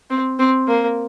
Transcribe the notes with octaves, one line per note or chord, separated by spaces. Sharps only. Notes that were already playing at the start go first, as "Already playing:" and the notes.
C4
C4
A#3